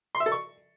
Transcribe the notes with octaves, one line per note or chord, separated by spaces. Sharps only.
C6
E5
A4
C#6